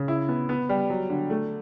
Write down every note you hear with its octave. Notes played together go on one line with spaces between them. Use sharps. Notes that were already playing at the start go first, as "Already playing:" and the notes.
Already playing: C#3
E4
B3
B3
G3
F#3
D3
A3